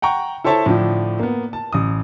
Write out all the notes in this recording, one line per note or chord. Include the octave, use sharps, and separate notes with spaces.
F#5 G5 A#5 C#6
E4 A4 C5 C#5 E5 A5
A2 D3 F3 D4
A#3 B3
A5
A1 D#6